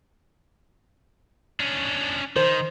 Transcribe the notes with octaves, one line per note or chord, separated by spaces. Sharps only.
C#4 D4
D#3 C5